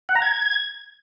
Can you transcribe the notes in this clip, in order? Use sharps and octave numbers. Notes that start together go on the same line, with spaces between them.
F#5
A#5
G#6